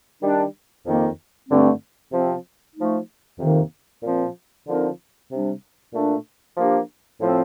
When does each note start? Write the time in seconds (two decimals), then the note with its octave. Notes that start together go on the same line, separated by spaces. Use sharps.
0.22 D#3 G3 D4
0.86 F2 D#3 A#3
1.48 G2 D3 A3 C4
2.12 C3 F3 C4
2.75 F3 A3 D#4
3.39 F2 C3 D#3 A#3 D#4
4.03 A#2 F3 C4
4.66 D3 F3 C4 D#4 A#4
5.30 C3 G3 D4
5.93 A#2 A3 D4
6.57 F3 A#3 D4 G4 A#4
7.20 A2 F3 C4